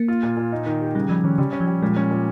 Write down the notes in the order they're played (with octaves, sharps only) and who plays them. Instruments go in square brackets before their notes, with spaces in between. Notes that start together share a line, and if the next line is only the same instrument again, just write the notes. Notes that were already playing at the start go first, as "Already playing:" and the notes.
Already playing: [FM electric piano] A#3
[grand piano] F4
A#2
A#2
D#4
D#3
G4
[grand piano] C#3 [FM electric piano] G3
[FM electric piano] F3 [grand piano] G3
[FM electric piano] D#3 [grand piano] C#4
[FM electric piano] C#3 [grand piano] G3
[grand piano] C#4
[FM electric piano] F3
[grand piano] G3
[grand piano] A#2 [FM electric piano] G#3
[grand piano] C#4
A#2